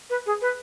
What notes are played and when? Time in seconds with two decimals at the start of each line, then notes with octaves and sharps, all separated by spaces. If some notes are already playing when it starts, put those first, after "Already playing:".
0.09 B4
0.26 G#4
0.41 B4